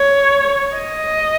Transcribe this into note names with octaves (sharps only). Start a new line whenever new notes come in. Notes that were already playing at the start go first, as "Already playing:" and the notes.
Already playing: C#5
D#5